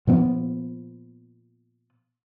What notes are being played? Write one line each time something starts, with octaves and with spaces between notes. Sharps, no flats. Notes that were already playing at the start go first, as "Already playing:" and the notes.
A#2 F3 B3